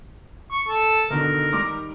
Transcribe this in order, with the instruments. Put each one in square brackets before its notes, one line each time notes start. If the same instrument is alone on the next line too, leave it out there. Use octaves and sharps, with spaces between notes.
[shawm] C#6
A4
[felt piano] B2 D3 D#3 [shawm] A#4
[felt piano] D#3 G3 D6